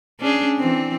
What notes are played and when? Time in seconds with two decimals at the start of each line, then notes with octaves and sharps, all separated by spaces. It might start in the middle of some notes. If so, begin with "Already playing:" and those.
0.20 C#4 D4 G#4
0.59 E3 C4